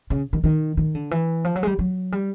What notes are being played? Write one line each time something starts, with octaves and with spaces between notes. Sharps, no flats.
C#3
D#3
D#3
D#3
D3
E3
F3
F#3
G#3
G3
F#3
G3